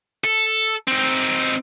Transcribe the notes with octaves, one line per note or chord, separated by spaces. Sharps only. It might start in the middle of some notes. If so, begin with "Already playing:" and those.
A4
C4 D#4